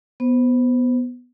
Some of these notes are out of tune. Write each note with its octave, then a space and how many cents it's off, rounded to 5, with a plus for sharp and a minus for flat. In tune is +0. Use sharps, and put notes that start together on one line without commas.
B3 +0 C5 +0